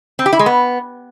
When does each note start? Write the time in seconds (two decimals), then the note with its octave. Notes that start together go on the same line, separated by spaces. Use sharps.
0.19 C4
0.26 G4
0.33 E4
0.39 G#3
0.46 B3